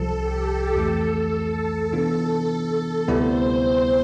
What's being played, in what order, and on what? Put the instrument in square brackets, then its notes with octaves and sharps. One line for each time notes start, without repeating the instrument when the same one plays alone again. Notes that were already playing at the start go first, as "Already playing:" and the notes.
Already playing: [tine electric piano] C2 C3 F3 [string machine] A4
[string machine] G4
[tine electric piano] F2 E3 A3 [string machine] A4
[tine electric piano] C3 E3 B3 D4 F4 [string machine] A4
[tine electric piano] D2 C3 G3 B3 E4 [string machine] C5